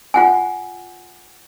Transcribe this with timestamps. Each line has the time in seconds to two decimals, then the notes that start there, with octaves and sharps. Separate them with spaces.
0.14 F4 F#5 G#5